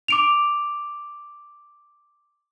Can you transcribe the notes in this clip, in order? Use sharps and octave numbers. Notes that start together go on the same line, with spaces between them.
D6 D7 F7